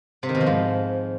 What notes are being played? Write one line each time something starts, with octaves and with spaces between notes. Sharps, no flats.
C3
D#3
B2
F3
G#2